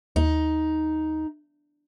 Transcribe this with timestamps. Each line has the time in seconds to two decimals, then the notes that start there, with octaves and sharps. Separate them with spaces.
0.16 D#2 D#4